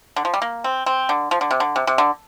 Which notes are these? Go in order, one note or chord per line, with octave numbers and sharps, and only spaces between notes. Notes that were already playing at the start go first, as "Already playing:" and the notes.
D3
F3
G3
A#3
C4
C4
D3
F3
D3
C3
D3
C3
C3
D3